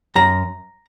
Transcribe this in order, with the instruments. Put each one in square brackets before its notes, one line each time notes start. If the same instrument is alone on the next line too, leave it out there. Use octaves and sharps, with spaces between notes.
[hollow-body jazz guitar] F#2 A#5